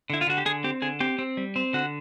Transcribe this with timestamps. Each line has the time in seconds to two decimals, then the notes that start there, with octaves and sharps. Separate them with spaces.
0.10 D3 E4
0.21 F4
0.27 D3 F#4
0.38 G4
0.46 D3 G#4
0.64 C4 G4
0.82 D3 G#4
1.00 C4 G4
1.19 C4
1.37 G3
1.56 C4
1.73 D3 F#4